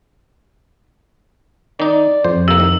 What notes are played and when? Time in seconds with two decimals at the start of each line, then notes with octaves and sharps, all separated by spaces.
1.80 D#3 D#4 D5
2.24 F2 C5
2.48 A2 C3 A#3 E6
2.60 D#3